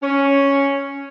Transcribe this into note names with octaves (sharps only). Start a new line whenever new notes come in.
C#4